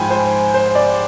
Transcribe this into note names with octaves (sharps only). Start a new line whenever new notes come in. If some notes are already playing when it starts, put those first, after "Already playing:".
Already playing: G#2 F3 G5 G#5 B5
C5
C5
D5